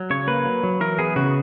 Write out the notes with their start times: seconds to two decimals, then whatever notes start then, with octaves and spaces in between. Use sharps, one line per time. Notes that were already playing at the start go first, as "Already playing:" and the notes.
Already playing: F#3
0.10 C#3 C#5
0.27 A#3 B4
0.45 F#3
0.63 F#3
0.81 E3 A#4
0.99 B3 G#4
1.16 C#3 F#4